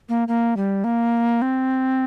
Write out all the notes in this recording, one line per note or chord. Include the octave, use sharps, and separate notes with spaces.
A#3
A#3
G3
A#3
C4